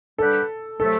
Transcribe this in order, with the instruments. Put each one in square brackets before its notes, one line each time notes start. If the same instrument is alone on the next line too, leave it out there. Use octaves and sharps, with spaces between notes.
[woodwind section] D3 G3 D4 G4 B4 [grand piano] A4
[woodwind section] C3 F#3 A3 [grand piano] A4